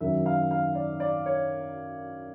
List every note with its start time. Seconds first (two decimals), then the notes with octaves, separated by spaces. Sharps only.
0.01 F#2 D#3 F#3 E5
0.26 F5
0.51 F5
0.75 D5
1.00 D5
1.26 C#5